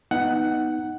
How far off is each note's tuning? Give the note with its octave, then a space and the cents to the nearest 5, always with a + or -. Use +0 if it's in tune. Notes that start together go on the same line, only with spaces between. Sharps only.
B3 +0 D#4 +5 F#5 +10